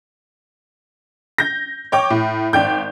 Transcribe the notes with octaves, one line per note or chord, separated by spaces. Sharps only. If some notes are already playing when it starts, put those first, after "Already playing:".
G6 A#6
C#5 G5 D6
A2
G#1 D5 G5 G6